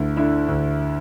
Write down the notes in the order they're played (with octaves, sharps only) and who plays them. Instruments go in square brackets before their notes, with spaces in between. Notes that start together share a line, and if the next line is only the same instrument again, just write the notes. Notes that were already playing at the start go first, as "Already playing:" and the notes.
Already playing: [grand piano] D2 A3 E4
D3 E4 E5
D2